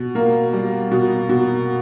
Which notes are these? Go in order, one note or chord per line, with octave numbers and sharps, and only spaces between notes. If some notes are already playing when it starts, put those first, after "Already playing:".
Already playing: B2
A#3
G3
B2
B2